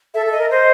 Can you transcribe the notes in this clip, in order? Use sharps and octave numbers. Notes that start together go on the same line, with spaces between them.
A4 E5
A4
D#5
A#4
C5 D#5